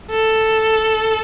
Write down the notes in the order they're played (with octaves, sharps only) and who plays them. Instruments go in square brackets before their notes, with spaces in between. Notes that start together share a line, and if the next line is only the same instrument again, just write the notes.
[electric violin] A4